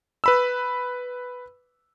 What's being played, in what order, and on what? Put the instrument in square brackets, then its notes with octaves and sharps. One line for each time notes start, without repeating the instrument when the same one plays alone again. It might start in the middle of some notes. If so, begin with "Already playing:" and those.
[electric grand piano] B4 B5 E6